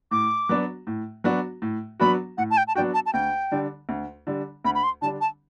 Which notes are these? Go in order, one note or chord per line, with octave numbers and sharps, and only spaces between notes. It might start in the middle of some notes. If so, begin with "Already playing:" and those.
A2 D6
F#3 B3 D4 F#4
A2
F#3 B3 D4 F#4
A2
F#3 B3 D4 F#4 B5
A2 F#5
A5
G5
A5
F#3 B3 D4 F#4 G5
A5
A5
D2 G5
D3 G3 D4
D2
D3 G3 D4
D2 B5
B5
C6
D3 G3 D4 A5
A5